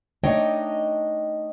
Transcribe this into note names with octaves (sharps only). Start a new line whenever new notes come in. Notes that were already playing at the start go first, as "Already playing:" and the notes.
A3 D4 D#4 C#5 D#5 G5